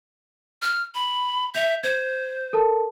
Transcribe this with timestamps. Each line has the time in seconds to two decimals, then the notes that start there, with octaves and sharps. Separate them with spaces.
0.62 F6
0.95 B5
1.55 E5 G6 F7
1.83 C5 G#6
2.53 A4 A#4 A5